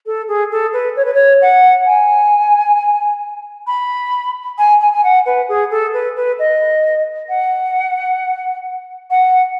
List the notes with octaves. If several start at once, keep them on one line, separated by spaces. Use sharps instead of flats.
A4
G#4
A4
B4
C#5
B4
C#5
F#5
G#5
B5
G#5
G#5
G#5
F#5
B4
G#4
A4
B4
B4
D#5
F#5
F#5